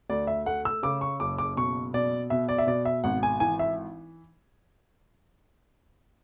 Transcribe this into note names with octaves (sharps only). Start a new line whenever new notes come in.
D2 D5
E5
A3 F#5
E6
C#3 D6
C#6
F#1 D6
D6
B2 C#6
B2 D5
B2 E5
D5
E5
B2 D5
E5
G#1 F#5
G#5
E3 G#5
E5